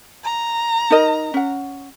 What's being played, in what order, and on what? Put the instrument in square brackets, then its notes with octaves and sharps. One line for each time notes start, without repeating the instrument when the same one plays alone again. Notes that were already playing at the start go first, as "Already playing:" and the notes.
[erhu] A#5
[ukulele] D#4 A#4 D#5
C#4 F#5